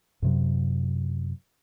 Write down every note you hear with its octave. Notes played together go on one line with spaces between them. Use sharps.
F#2 C3 F#3